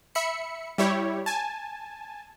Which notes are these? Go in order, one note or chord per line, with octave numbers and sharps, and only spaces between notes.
E5 B5 C#7
G3 E4 G4 C#5
G#5 A5